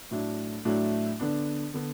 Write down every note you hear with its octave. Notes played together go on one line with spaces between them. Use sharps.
A2 F#3 A3 D4
A2 F#3 A3 D4
D3 B3 D4
D3 B3 D4